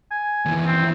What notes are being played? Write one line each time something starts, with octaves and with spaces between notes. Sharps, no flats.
G#5
D#2 E3
C4